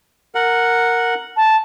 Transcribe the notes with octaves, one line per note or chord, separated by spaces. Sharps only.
A#4 F#5
A5